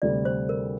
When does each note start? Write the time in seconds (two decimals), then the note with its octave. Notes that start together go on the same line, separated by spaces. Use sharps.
0.02 D2 C3 G3 D5
0.25 C5
0.49 A#4